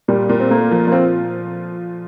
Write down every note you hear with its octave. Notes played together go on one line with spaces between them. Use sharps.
A#2 G3
A#2
C4
A3 A#3
F3
A#3
C4 F4